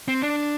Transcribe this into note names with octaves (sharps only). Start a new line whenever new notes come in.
C4
D4